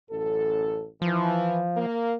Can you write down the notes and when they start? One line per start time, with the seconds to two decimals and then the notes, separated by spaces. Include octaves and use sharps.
0.11 A1 F#2 A4
1.02 E3 F3
1.76 A#3